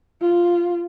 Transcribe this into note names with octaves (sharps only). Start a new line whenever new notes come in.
F4